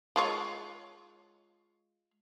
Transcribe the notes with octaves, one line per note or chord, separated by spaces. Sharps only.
G#3 F4 C#5